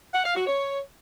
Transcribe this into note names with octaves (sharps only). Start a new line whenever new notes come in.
F#5
F5
F#4
C#5